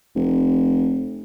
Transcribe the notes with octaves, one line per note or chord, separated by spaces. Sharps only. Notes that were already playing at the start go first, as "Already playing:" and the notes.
F1